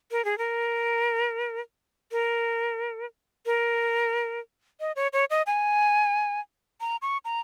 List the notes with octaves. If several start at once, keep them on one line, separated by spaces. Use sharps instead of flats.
A#4
G#4
A#4
A#4
A#4
D#5
C#5
C#5
D#5
G#5
A#5
C#6
A#5